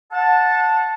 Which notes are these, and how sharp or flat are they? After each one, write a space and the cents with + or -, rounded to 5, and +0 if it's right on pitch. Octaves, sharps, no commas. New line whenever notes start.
F#5 -25 A5 +0